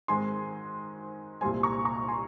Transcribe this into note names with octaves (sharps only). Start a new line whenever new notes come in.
G#2 D#3 G#3 C4 G#5 C6
C2 A#2 G3 C4 G#5 C6
A#5 C#6
A#5 C#6
G#5 C6